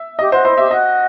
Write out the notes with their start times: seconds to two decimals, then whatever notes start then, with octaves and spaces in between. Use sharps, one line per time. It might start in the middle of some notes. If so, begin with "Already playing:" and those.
Already playing: E5
0.19 G4 D#5
0.32 F#4 C5
0.45 E4 C5
0.57 G4 E5
0.71 F#4 D#5